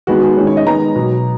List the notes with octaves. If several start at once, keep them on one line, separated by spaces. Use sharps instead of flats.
D#3 G#3 B3 F#4
G#4
D#3 G#3 C#4
C#5
D#5
D#3 G#3 B3 A#5
B2 F#3 B3